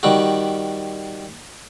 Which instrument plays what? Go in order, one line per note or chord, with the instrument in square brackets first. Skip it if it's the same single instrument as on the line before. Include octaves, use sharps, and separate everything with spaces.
[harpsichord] D#3 G3 F#4